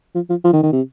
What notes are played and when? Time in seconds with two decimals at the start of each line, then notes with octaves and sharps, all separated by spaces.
0.15 F3
0.30 F3
0.44 F3
0.53 D#3
0.63 D#3
0.73 C3